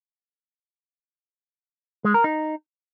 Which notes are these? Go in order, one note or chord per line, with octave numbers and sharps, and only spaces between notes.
G#3
A#4
D#4